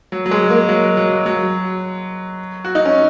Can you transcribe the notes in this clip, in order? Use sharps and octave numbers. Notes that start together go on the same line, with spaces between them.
F#3
F#3
G#3
A#3
F#3
F#3
F#3
F#4
D#4
C#4